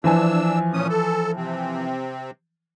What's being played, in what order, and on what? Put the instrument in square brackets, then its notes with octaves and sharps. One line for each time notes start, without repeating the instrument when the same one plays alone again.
[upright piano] E3 F3 G#5 [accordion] D4 E6
[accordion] A#2 C#4 D#6
A4
C3 C4